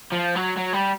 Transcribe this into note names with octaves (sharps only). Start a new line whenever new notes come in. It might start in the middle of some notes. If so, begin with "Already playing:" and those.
F3
F#3
F#3
G3